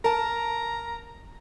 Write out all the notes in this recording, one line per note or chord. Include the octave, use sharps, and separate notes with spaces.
A#4 A5 A#5